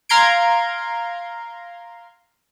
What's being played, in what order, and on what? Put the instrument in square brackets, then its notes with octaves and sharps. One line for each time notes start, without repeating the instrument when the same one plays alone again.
[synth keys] F5 A#5 C6 G#6 D7